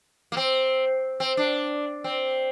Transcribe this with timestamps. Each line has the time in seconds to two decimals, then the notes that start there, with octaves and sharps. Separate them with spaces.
0.32 A#3
0.37 C4
1.20 C4
1.37 D4
2.04 C4